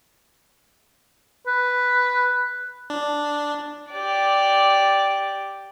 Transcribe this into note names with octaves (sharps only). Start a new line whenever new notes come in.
B4
D4
G4 D5